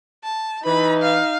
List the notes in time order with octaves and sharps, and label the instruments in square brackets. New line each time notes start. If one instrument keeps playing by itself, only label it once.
[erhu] A5
[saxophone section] E3 B4 [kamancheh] D#4 [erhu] B5
[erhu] F5